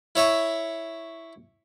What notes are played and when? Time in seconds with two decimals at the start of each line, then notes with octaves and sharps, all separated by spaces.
0.16 E4 C#5 E5 C#6